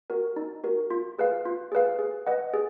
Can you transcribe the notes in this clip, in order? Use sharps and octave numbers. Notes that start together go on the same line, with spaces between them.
F#4 A#4
D#4
F#4 A#4
F4
G#4 B4 F5
F4
G#4 B4 F5
G#4
B4 D#5 F#5
G#4